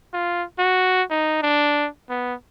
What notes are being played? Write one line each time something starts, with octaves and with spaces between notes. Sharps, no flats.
F4
F#4
D#4
D4
B3